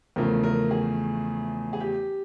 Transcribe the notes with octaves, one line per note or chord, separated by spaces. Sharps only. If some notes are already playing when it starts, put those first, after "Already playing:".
E2 C#3 F3 A3 A#4
A#4
G#4
G#4
G4